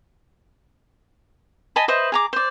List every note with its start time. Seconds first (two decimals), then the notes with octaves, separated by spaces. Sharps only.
1.76 D#5 G#5 A5 B5
1.88 B4 C5 D#5 E5
2.12 G#4 A#5 D6
2.33 C5 D5